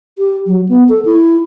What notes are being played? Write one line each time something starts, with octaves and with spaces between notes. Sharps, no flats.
G4
F#3
B3
A4
E4